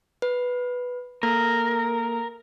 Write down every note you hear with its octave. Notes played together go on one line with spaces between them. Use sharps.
B4
A#3 A4 A#4